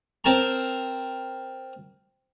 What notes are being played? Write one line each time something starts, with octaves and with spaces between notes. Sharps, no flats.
C4 A#4 A5 A#5